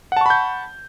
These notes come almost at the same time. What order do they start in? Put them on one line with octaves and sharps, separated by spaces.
F#5 A5 C#6 B5 G6